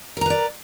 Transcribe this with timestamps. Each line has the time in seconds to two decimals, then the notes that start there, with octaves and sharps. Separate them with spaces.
0.17 A#4
0.21 A#5
0.26 B4
0.30 D5